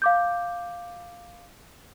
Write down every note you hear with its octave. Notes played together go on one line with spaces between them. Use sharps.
F5 D6 G6